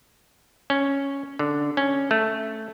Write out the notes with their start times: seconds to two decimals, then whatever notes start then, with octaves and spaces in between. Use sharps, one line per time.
0.70 C#4
1.39 D3
1.77 C#4
2.11 A3